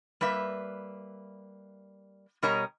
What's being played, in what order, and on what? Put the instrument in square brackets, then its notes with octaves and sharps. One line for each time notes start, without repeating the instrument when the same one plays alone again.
[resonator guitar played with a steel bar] G3 A#3 B4 E5
B2 G3 A#4 C#5 D#5 A#5